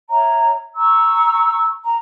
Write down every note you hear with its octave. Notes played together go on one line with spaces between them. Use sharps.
C#5 E5 A#5
A#5 C#6 E6
A#5